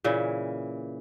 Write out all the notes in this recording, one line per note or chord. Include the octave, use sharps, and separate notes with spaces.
A#2 C#3 E3